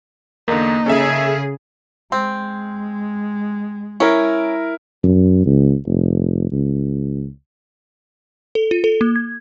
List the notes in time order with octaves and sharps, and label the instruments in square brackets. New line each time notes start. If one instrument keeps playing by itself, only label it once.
[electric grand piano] E2 D3 [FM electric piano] A#3 [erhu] D#4
[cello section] C#3 G#4 [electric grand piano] C#4 A4 E5
[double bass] G#3 [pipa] C4
[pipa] C#4 [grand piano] E4 A#4
[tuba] F#2
C#2
F1
C#2
[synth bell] A4
F4
A4
A#3
G#6